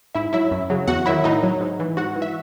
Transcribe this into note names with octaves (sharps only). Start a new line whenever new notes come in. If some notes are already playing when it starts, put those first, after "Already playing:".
G#2 E4 E5
F#3 E4 E5
F#2
C#3 F#3
E2 F#4 F#5
D#3 F#3 E4 E5
A2 D#4 D#5
F#3
G#2
E3
G#2 F#4 F#5
E3
E5